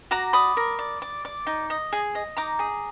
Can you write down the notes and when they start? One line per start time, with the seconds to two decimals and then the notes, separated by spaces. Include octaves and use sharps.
0.11 F#4 A#5 D6
0.33 D5 B5 D#6
0.57 A#4
0.79 D5
1.02 D5
1.25 D5
1.47 D#4
1.70 D#5
1.93 G#4
2.15 D#5
2.37 D#4 A#5 D6
2.59 G#4